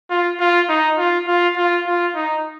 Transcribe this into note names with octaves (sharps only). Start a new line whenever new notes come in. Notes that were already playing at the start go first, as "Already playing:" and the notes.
F4
F4
D#4
F4
F4
F4
F4
D#4